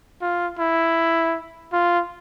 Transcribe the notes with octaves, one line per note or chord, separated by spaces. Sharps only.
F4
E4
F4